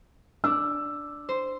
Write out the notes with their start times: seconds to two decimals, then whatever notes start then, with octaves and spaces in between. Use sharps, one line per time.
0.44 D4 E6
1.29 C5